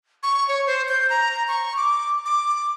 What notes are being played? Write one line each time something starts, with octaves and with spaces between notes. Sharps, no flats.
C#6
C#5
C5
G6
A#5
C#6
D6
D6